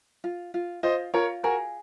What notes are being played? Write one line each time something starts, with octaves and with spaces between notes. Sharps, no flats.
F4
F4
F4 C5 D#5
F4 A#4 C#5
F#4 G#4 A#4